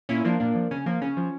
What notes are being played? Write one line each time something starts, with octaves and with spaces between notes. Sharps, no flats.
A#2 C#4 E4
F3 A#3 D4
A#2 A#3 D4
F3
C#3 C#4
F3 A#3
C#3 C#4
F3